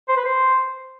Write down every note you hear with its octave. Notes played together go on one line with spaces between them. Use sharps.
C5
B4
C5